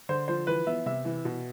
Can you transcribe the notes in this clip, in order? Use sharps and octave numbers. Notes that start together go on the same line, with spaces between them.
D3 C5
F3 C5
E3 B4
B3 E5
C3 E5
E3
B2